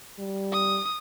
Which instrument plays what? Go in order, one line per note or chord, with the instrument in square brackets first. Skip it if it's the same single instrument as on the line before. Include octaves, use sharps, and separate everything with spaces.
[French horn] G3
[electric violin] D#6